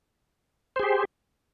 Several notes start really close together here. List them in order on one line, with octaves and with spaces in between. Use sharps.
C5 G#4 G4